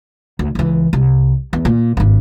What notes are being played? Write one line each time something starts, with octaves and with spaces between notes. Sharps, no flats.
D2
C#2 E3
C2
E2
A#2
G#1 G2